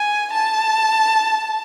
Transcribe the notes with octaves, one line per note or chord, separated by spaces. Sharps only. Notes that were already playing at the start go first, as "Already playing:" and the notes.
Already playing: G#5
A5